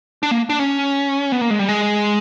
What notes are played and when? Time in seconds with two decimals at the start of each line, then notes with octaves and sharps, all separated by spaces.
0.23 D4
0.31 A#3
0.49 D4
0.59 C#4
1.32 B3
1.41 A#3
1.50 G#3
1.59 G3
1.69 G#3